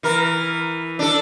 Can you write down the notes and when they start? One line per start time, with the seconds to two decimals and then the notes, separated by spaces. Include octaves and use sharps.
0.03 E3 A#4
0.99 D4 A4